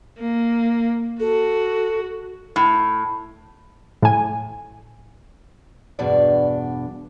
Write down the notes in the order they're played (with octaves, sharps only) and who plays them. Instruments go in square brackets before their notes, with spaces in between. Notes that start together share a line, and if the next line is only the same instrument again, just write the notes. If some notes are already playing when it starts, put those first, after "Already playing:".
[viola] A#3
[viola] F#4 [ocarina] A4
[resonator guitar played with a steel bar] A2
[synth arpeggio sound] A2 G#5
[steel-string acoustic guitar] E2 G2 B2 D4 D5